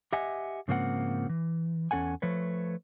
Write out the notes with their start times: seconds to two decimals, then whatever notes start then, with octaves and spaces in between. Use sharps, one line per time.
0.13 G4 D#5 E5 F#5 G#5
0.68 G#2 C#3 F3 A#3 C4 F#5
1.29 E3
1.91 E2 C#4 A4 F#5 G#5
2.22 F3 A3 B4 C#5